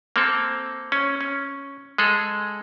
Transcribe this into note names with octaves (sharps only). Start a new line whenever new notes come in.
A#3 C4 A4
C#4
C#4
G#3 G#4 A4